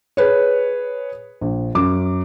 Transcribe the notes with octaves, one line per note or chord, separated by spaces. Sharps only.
G#4 B4 C#5
A#1
F#2 D6